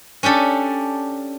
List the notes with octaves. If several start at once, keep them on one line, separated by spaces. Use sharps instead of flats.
C#4 D4 G4 A4